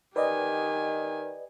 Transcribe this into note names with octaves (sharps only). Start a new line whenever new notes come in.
D#3 G4 B4 D5 D#5 G#5